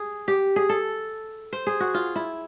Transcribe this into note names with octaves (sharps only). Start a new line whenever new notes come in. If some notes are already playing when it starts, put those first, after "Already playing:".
Already playing: G#4
G4
G#4
A4
C5
G#4
F#4
F4
E4